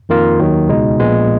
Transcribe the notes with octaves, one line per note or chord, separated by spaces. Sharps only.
F2 D#3 A#3 F4 A#4
D#2 D#3 F#3
C#2 B2 G#3 D#4
A#1 A#2 G#3 B3